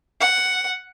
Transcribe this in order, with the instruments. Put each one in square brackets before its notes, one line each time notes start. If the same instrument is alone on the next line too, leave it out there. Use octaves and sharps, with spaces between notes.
[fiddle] F#5